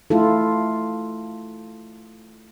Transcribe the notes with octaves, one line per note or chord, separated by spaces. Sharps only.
A3 E4 F4 A4